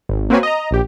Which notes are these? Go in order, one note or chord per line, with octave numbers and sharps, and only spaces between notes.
G#1
A#3 C4 F#4 B4 C#5 G#5
D#5 A#5
A#1 G4